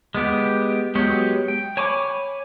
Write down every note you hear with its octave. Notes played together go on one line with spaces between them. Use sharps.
G#3 B3 G4
F#3 G#3 B3 G4 C#5
G5
C#5 G#5 B5 C#6 D6